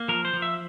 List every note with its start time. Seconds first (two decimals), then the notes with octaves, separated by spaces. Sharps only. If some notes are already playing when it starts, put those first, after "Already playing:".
Already playing: A#3
0.08 F3 A#4
0.25 C5
0.34 F3
0.42 E5